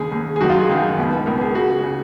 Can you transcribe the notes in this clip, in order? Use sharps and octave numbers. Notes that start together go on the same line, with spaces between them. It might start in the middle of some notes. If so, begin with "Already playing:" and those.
Already playing: D#2 C#3 G#4
D#2 C#3
G#4
F#2 D#3 F#4
F4
G#4
F#2 D#3
C#2 B2
C#2 B2 A#4
G#4
C#2 C#3 F#4
C#3